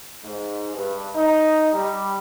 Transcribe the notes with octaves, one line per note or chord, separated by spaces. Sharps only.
G#2
G2
D#4
G3